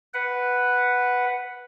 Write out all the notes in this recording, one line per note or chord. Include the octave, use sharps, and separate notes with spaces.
B4 F#5